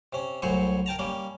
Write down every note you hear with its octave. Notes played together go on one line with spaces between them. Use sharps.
C3 C#4
C2 A2 F#3 C5 G#5 C#6
A#4 G5 A5 A#5
G3 A#3 C#4